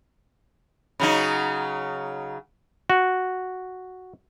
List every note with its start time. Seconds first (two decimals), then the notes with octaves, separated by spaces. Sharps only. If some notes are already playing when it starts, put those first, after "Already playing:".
1.00 C#3 F#3 D#4
2.90 F#4